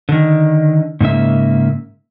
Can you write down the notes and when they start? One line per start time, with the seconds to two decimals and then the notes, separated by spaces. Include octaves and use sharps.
0.09 D3 D#3
1.00 G#2 C#3 A#3 E5